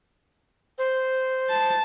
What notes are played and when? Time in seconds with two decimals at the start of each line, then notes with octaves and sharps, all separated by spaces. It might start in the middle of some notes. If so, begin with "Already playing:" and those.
0.78 C5
1.50 A5